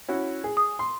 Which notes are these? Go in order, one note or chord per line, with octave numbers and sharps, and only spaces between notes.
C#4 E4 F#4
G#4
D#6
C6